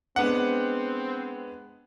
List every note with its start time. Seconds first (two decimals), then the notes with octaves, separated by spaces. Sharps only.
0.16 G#3 B3 C4 D4 F#5